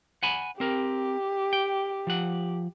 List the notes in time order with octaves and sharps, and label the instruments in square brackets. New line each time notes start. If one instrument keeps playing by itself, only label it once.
[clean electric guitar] F#5 G#5 B5
[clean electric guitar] C4 A#4 [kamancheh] G4
[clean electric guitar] G5
F3 F#5